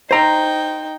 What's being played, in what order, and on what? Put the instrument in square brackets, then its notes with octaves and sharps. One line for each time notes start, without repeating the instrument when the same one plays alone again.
[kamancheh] D#4 G5 [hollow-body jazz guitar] C5 A#5